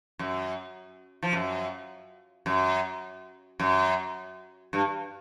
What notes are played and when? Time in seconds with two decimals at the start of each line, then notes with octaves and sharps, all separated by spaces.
0.19 F#2
1.23 F3
1.33 F#2
2.46 F#2
3.60 F#2
4.73 G2